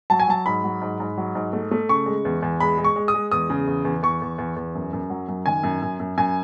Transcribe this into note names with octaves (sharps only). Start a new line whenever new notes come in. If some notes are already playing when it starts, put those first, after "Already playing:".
F#3 A5
G#5
F#3 A5
G#2 B5
F#3
G#2
G#2
F#3
G#2
A3
A3
C#3 C#6
G#3
E2
E2
G#3 B5
G#3
C#6
G#3
D#6
G#3
E2 D#6
C#3
E2
E2
E2 C#6
E2
E2
E2
F#2
F#2
F#3
F#2
D#3 G#5
F#2
F#2
F#2
F#2 G#5